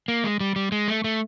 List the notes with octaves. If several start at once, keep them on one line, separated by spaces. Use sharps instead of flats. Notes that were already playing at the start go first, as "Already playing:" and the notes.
A#3
G#3
G3
G3
G#3
A3
A3